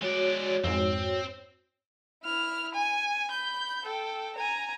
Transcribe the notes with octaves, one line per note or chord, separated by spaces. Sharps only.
G#3 F#4 C#5 D5
F2 G#2 C4
E4 F6
G#5
B5 G6
A4 G5
G#5 A#5